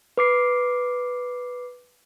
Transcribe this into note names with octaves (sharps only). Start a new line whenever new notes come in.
B4 D6 C7